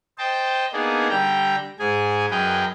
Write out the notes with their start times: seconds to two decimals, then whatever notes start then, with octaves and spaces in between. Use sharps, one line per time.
0.18 C5 D#5 G5 A5
0.73 A#3 B3 D4 D#4 G#4
1.09 D3 G3 G5 A#5
1.79 G#2 G#4 G#5
2.30 F#2 G#4 A#4 B4 D#5 G5